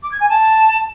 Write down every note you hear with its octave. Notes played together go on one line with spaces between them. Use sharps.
D6
G#6
G#5
A5